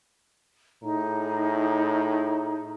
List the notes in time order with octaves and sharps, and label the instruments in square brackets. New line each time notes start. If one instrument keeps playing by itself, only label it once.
[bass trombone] A2 [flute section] D#4 G#4 A#5